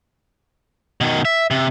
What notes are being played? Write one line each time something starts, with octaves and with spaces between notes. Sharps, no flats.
B2 D#3
E5
C3